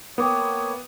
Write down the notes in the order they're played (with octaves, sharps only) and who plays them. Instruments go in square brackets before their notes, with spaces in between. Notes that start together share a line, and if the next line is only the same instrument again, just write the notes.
[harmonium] A#3 C#5 [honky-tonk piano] B3 [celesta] G5 D6 D#6